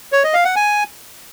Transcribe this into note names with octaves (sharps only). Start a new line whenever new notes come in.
C#5
D#5
F5
F#5
G#5